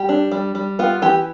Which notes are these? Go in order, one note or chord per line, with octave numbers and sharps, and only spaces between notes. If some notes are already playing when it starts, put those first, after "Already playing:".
Already playing: G3 G4
D4
G3
G3
B3 F4
E3 G4